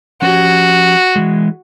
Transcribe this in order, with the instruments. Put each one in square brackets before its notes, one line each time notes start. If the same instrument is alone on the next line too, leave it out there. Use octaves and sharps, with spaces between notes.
[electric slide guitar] F3 C#4 G4 [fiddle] F#4
[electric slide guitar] E3 G#3